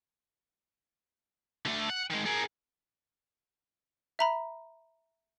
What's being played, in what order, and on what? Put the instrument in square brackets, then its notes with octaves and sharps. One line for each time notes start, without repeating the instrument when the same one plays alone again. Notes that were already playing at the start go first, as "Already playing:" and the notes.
[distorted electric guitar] D3 A3
F#5
D#3 G#3
G#4 A#4
[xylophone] E5 A#5 B5